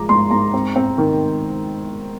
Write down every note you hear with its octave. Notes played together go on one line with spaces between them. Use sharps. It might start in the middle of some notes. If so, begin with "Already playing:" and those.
Already playing: F3 G#3 A#5 D6
G#2 C6
G#2 A#5
C4
C4
D#3